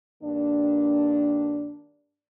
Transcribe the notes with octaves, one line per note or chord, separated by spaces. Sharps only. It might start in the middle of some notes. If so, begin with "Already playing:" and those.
G2 D#3 A#3 D4